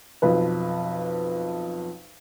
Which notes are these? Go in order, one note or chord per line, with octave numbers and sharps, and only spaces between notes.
B1 F2 B4